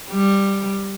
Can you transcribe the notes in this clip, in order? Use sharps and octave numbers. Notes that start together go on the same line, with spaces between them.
G3